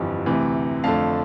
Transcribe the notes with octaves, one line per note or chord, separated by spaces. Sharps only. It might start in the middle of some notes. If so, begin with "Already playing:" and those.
Already playing: G1 F2 E3 G3
D2 C3 E3
F2 D3 A3 F5 A5